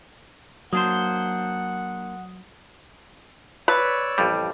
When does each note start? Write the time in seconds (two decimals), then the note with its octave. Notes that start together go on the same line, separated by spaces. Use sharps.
0.73 F#3 A#3 D4 C5 F#5 D#6
3.68 B4 C#5 D5 E6
4.18 A1 F2 G3